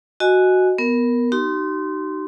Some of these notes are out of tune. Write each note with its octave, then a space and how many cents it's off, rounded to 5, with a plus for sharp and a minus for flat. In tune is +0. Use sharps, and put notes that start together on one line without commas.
F#4 +0 D#5 +0 G#5 +10
B3 -5 A#4 +0
D#4 -10 G4 -45 C6 -10